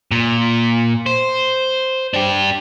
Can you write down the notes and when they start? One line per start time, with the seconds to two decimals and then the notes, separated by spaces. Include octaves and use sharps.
0.11 A#2
1.06 C5
2.14 D4 G4